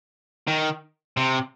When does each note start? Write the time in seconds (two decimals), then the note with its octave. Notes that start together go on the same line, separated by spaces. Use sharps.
0.47 D#3
1.17 C3